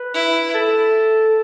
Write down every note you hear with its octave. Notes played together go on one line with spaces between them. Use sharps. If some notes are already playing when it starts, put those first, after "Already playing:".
Already playing: B4
E4
A4